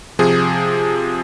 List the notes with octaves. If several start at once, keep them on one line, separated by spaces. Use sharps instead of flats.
C3 F3 G#4